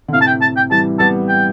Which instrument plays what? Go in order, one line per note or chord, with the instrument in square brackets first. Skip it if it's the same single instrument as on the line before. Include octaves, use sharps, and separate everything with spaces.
[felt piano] D3
[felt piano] A2 C3 [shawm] F5
[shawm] A5
G5
A5
G5
[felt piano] E3 G3 [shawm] A5
[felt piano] G3 B3 [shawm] A5
[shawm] G5